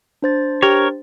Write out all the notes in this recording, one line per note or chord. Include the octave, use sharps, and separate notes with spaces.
D4 C5 A6
G4 A#4 C#5